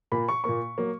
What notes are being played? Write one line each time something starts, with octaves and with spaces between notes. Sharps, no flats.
A#2 A#3 B5
C#6
A#2 A#3 C#6
F#3 A#3